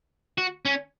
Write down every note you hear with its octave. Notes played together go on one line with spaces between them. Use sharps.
F#4
C#4